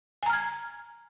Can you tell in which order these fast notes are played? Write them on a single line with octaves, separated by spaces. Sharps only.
G#5 A#5 F6 G#6